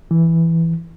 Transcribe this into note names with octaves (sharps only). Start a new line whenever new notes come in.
E3